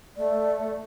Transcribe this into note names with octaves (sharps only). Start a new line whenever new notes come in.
A3 D5